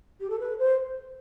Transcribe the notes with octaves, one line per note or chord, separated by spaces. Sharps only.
G4
A4
B4
C5